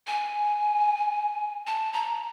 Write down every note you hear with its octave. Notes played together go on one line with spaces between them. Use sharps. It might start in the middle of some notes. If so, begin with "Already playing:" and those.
G#5
A5
A#5